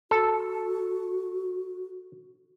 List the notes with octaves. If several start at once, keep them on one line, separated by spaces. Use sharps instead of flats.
F#4 A4